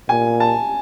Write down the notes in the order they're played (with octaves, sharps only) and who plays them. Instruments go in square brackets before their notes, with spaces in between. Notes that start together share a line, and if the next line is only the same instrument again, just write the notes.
[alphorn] A#2 [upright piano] G#5
[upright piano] A5